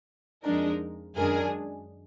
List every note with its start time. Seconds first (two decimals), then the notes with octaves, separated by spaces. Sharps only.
0.43 F2 F3 G#3 D4 D#4 A#4
1.16 F#2 D#3 G#3 D4 G#4 A#4